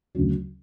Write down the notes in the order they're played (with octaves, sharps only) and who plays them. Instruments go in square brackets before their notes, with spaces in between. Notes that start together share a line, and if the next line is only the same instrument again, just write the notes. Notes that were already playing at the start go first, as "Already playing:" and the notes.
[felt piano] D2 C#3 F#3